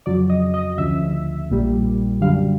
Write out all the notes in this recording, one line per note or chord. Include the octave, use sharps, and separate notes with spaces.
F2 C#3 F#3 D5
D#5
D#5
D2 C#3 F3 E5
A#1 A#2 G3
F#2 D3 G3 F5